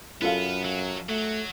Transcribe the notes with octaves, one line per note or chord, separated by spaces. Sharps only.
F#2 B3 F4 A4 F5
F#3
F#3 A3